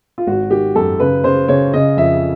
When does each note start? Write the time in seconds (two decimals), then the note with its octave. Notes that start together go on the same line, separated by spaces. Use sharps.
0.18 F4
0.27 G#1 F#4
0.51 D#3 G4
0.75 F#2 A4
1.00 C#3 B4
1.24 C#3 C5
1.48 C#3 C#5
1.73 C#3 D#5
1.97 F2 E5